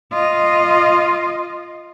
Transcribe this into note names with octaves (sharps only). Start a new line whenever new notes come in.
F4 D#5